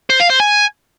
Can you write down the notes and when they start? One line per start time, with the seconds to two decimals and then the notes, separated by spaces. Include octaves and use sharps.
0.10 C5
0.20 F5
0.30 C5
0.40 G#5